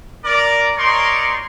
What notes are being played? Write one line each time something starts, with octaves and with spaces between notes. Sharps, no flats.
A#4 D5
D#4 A#4 C#5 D5 C6 C#6